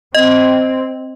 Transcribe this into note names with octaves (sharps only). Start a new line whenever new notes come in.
C4 D#5